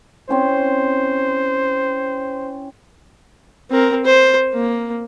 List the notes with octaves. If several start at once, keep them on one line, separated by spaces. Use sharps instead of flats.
C4 C#4 E4 C5
C4 A#4
C5
A#3